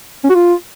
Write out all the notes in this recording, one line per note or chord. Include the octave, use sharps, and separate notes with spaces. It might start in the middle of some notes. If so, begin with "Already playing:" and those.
C#4
F#4
F4